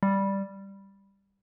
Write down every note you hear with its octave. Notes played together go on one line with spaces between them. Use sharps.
G3